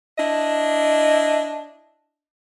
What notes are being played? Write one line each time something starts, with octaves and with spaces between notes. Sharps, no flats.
D4 E4 D#5